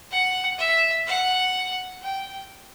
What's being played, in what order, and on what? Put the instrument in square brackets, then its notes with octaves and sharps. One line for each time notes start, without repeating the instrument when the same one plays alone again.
[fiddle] F#5
E5
F#5
G5